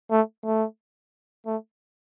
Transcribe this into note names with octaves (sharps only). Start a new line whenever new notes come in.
A3
A3
A3